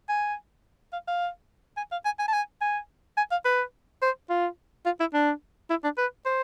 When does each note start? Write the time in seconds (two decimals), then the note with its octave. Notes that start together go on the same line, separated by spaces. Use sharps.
0.09 G#5
0.93 F5
1.08 F5
1.77 G#5
1.92 F5
2.05 G#5
2.19 G#5
2.28 A5
2.33 G#5
2.61 G#5
3.17 G#5
3.31 F5
3.45 B4
4.02 C5
4.30 F4
4.86 F4
5.00 E4
5.14 D4
5.70 E4
5.84 D4
5.98 B4
6.25 C5